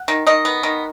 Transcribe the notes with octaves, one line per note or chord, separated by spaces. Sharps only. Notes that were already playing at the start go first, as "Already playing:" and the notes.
Already playing: F#5
D#3
D#3 D#5
B3
D#3